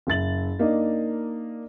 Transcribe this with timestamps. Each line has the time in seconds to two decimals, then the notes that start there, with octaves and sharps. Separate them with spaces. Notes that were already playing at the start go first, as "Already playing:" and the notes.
0.07 F#1 E5 A6 F#7
0.59 A#3 D4 D#4 A#4 D5 D#5